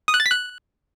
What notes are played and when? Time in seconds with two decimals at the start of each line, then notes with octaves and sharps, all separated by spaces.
0.08 D#6
0.14 F#6
0.20 A6
0.26 B6
0.32 F#6